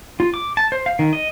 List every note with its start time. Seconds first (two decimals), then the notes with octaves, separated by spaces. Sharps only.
0.20 F4
0.34 D6
0.57 A5
0.72 C5
0.86 F5
0.99 D#3
1.13 D#5